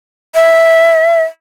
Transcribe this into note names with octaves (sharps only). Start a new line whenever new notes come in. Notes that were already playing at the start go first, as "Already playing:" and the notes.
E5